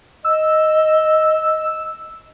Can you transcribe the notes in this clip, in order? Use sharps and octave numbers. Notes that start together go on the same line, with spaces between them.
D#5 E6